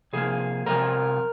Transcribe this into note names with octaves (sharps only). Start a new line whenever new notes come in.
C3 F3 A#3 G#4
F2 C3 F3 A#4